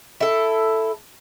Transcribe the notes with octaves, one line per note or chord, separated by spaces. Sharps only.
E4 A4